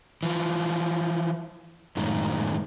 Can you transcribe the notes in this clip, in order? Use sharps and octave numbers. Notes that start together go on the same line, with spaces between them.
E3 F3
F#2 A2 D#3 G#3